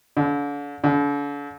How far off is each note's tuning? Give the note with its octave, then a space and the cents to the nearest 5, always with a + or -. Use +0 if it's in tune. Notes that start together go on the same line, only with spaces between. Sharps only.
D3 -40
D3 -45